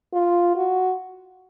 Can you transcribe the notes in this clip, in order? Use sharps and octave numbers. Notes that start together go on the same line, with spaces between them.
F4
F#4